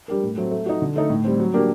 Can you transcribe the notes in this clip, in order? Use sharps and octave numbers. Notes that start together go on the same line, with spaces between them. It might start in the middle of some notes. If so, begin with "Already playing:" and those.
G3 D4 G4 A#4
A2
F#3 A3 C4
A3
D#4 F#4
D3
A3 D#4 A4
A2
G3 C4
F#3
A#3 D4 G4 A#4